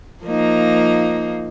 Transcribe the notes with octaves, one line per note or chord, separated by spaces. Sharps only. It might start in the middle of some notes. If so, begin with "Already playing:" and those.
F3 A#3 D#4